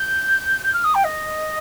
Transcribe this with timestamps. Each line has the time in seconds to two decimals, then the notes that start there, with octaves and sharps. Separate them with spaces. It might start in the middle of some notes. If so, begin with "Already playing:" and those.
Already playing: G6
0.64 G6
0.73 F6
0.84 D#6
0.95 G5
1.04 D#5